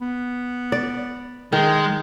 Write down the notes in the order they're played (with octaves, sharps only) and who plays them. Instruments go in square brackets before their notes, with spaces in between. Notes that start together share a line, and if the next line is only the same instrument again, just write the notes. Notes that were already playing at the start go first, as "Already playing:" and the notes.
[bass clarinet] B3
[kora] D5
[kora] D#3 [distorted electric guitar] G#3